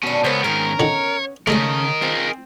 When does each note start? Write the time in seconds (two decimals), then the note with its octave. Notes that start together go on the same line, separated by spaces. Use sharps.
0.03 B2 F#3 C#4 D4
0.24 C#2 B3 A#4 C5 C#5
0.44 G#2 D#3 B3 C#4 A#4
0.80 D3 D#3 C#5
1.47 C#3 G#3 A3 C#4 A4 A#4 D#5
2.02 C4 F4 G#4